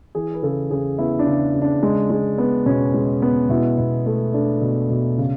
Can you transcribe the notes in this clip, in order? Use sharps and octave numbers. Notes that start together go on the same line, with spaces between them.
E3 G#4
B4
C#3 A4
C#3 G#4
B3 E4
D4
C#3
C#3
D4
G#3
G#3
B3
B2 C#4
G#3
B3
B2 E4
B2
A3
A3 D4
B2
B2
C#3